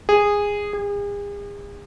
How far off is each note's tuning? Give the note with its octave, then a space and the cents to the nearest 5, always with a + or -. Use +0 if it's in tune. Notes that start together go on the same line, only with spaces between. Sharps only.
G#4 -15
G#4 -40